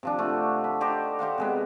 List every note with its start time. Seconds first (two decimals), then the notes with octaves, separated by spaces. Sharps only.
0.03 C3 F3 D4
0.18 C3 A3 D4 F#4
0.64 B5
0.81 D#4 G4 C5 D5
1.19 G4 C5 F5 F#5
1.38 C3 G#3 B3